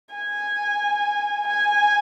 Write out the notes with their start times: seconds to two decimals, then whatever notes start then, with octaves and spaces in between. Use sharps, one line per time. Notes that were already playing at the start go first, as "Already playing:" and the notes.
0.15 G#5
1.48 G#5